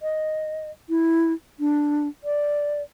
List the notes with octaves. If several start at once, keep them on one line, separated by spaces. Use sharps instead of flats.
D#5
E4
D4
D5